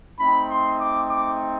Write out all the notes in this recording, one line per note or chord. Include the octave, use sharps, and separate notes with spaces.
A3 C4 D#4 B5
C6
D6
D6